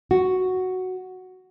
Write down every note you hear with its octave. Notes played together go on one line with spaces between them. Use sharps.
F#4